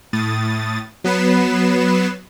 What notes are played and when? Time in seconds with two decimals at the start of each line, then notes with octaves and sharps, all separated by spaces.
0.13 A2 D#6 A6
1.04 F#3 B3 B4 C7 E7